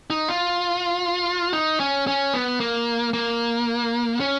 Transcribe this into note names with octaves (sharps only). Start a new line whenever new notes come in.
D#4
F4
D#4
C#4
C#4
B3
A#3
A#3
C#4